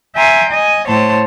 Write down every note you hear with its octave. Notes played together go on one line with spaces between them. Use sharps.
E5 G5 G#5 A#5 C6
D#5 G#5
A2 C5 C#5 A5